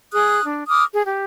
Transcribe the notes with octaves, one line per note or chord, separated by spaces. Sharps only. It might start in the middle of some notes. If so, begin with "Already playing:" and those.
G#4 D#6 F#6
D4
D6 D#6 F6
G#4
G4